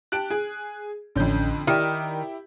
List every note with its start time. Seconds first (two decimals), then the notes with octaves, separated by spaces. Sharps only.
0.12 G4 A5 F#6 D7
0.30 G#4
1.16 A1 F2 D3 C#4 G6
1.67 D#3 E4 G4 A#4 D5